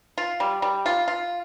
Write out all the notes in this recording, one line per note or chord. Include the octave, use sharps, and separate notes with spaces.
F4
G3
G3
F4
F4